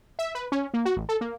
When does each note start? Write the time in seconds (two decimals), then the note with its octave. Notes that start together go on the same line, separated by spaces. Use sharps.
0.19 E5
0.35 B4
0.52 C#4
0.74 A#3
0.85 F#4
0.96 A1
1.09 A4
1.21 A#3